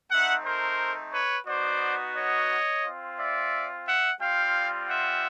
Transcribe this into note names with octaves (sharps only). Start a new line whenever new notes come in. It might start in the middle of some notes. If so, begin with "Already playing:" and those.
A3 C4 D#4 E5 F#5
A#4 C5
B4 C#5
B3 D#4 F#4 C5 D5
C#5 D#5
C4 F4
D5 E5
E5 F#5
G3 C4 F4 F5 G5
E5 F#5